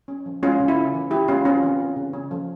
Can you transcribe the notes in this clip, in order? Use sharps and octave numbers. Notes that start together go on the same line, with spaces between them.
C#4
F3
G#3 C#4 F4
C#3
E4
C#4
E3
E3 E4 G4
G#3 C#4 F4
C4 C#4 F4
E3
E3
C#3
C#4
F3